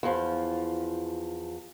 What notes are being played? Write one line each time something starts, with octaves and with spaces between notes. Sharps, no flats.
E2 F3